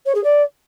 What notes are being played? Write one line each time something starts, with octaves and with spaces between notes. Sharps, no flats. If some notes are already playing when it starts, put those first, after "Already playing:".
C#5
G#4
D5